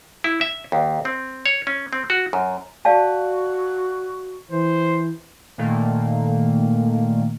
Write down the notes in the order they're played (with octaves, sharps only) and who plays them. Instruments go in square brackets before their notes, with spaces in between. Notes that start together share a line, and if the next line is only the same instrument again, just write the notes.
[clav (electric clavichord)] E4
E5
D#2
C4
C#5
C#4
C4
F#4
F#2
[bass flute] F#4 [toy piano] D5 F5 A5
[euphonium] E3 [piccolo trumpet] C5
[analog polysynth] A#2 D#3 A3 A#3